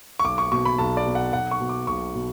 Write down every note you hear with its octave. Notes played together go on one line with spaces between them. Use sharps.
C#6
B1 D6
C#6
B2 C#6
B5
B1 A5
D5
B2
F#5
B1 F#5
C#6
B2
D6
B1 C#6
B2